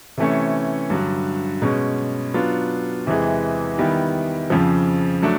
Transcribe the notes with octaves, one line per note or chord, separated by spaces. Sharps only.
C3 E3 A3 C#4
G2 D3 F#3
B2 G#3 C#4
F#3 B3 D4 F4
E2 C3 E3 G#3
D#3 G3 B3 E4
F2 C#3 F3
F#3 A3 D4